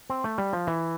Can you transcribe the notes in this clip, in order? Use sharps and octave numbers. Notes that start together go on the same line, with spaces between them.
C4
A3
G3
F3
E3